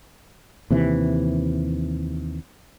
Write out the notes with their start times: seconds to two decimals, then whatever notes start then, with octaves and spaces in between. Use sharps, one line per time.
0.71 D#2 C3 E3